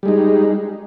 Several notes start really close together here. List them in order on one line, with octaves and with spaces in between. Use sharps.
G3 G#3 D#4